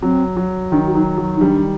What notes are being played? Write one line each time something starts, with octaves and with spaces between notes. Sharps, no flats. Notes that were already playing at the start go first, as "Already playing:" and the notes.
F#3 C4
F#3
D#3 D4
F#4
F#3 D#4
F#3
D#4
D#3 G3 D4